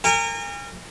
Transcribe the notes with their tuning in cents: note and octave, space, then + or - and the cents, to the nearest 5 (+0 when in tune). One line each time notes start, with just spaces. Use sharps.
A#4 -30 G#5 -40